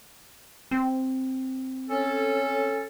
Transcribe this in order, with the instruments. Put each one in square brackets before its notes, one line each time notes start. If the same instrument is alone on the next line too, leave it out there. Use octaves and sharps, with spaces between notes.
[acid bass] C4
[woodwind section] C#4 A4